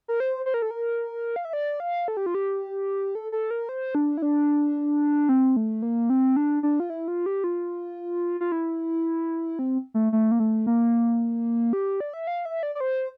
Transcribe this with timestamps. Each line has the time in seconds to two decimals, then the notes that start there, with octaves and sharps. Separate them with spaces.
0.08 A#4
0.20 C5
0.46 C5
0.54 A#4
0.62 A4
0.71 A#4
1.36 F5
1.45 E5
1.53 D5
1.80 F5
2.08 A4
2.17 G4
2.26 F4
2.35 G4
3.15 A4
3.32 A4
3.51 A#4
3.69 C5
3.95 D4
4.18 E4
4.22 D4
5.29 C4
5.56 A3
5.82 A#3
6.10 C4
6.36 D4
6.63 D4
6.80 F4
6.90 E4
7.08 F4
7.26 G4
7.44 F4
8.41 F4
8.52 E4
9.59 C4
9.94 A3
10.13 A3
10.31 A#3
10.40 A3
10.66 A#3
11.73 G4
12.00 D5
12.14 E5
12.27 F5
12.45 E5
12.63 D5
12.75 D5
12.80 C5